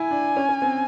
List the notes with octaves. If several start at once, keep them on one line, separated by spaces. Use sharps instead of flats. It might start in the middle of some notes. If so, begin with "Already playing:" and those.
Already playing: E4 G#5
D4
C#4
C#4
C4